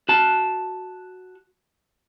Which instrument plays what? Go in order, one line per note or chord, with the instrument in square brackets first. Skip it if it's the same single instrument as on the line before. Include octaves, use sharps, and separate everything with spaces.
[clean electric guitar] F#4 A5